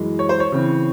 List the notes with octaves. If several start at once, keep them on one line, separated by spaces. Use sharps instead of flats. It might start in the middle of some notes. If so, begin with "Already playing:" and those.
Already playing: F#2 E3 G#3
C#5
C5
C#5
C#3 E3 C4